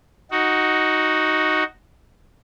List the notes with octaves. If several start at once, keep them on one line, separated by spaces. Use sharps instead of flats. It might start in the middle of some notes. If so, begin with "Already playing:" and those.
D#4 F#4